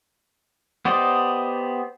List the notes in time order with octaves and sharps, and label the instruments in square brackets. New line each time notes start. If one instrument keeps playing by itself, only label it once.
[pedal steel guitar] B3 G4 C5 D5 D#5